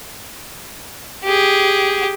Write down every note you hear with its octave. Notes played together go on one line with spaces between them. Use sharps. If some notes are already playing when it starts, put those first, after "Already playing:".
G4 G#4